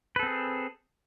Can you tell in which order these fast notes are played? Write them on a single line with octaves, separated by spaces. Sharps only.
B4 A4 C4 G#4